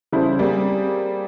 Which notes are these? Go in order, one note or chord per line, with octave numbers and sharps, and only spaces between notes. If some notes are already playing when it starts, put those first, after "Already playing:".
C#3 G3 E4 A4 C5
G3 A#3 C4 G#4